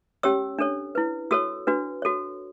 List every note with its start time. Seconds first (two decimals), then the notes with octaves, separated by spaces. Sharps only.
0.23 C#4 G4 C#5 E6
0.59 D4 A4 C#5
0.95 E4 B4
1.31 F#4 A4 C#5 E6
1.67 D4 F#4 B4
2.02 F#4 A4 C#5